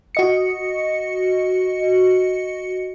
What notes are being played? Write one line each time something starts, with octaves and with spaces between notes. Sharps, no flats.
F#4 D#5 C#7